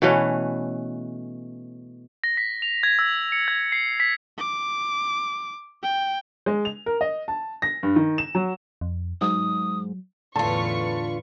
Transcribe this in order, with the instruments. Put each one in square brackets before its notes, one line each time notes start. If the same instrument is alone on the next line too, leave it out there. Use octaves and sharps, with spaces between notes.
[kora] B2 E3 A3 C#4
[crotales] A#6
B6
F7
G#6
E6
C#7
G#6
C7
B6
[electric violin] D6
G5
[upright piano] G#3
F7
A#4
D#5
A5
A#6
G2
D#3
E7
F#3
[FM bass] F2
[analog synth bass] G#2 [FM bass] F#3 [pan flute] D#6
[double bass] E2 A2 [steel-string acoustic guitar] D3 F4 [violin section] B4 C#6 [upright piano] A5